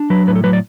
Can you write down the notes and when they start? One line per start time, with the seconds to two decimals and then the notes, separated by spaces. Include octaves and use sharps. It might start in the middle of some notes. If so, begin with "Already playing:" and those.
Already playing: D4
0.10 F#3 B4
0.27 A2 B4
0.36 A4
0.44 F#3 B4
0.53 D5